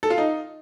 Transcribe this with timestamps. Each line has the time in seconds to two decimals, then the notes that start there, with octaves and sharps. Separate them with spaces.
0.03 A4
0.10 F4
0.18 D#4